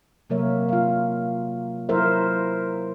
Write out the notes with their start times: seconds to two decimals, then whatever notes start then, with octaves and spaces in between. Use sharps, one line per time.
0.30 C3 F#3 A#3 A#4 C#5 E5
0.69 F4 F5
1.89 F#3 E4 A#4 C5 E5